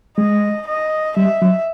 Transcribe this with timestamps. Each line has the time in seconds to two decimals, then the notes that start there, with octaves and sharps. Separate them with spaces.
0.18 G#3 D#5
0.67 D#5
1.17 G3 E5
1.42 F#3